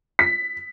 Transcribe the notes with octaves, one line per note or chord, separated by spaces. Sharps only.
B6